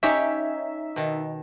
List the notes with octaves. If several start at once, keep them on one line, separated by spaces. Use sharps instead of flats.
C#4 D#4 G4 C#5 E5
B2 D#3